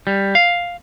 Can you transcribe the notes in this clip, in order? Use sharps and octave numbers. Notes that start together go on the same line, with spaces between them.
G3
F5